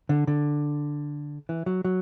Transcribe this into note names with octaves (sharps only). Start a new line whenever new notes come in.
D3
D3
E3
F#3
F#3